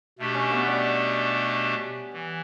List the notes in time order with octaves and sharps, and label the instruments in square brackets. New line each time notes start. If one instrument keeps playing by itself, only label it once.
[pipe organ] B2 A3 D4 G4
[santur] C#4
B3
G3
[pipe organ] E3